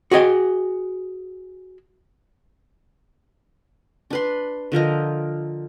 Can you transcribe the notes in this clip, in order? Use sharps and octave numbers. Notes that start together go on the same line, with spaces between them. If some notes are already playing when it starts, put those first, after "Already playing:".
F#4 G#4 D#5 G5
D4 B4 C6
D3 F3 A#4 D#5